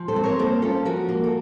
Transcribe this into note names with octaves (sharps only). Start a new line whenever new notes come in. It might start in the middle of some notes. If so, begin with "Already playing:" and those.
Already playing: F3
A4 C5
C4
A#4 C#5
A#3 A4 C5
C#4 F4 A4
F3 F#4 A#4
A#3
A4